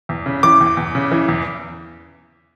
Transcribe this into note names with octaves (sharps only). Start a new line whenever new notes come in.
E2
C#3
E3 D6
E2
E2
C#3
E3
E2